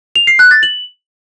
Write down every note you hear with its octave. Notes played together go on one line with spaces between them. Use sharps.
F7
C7
F#6
A6
F#7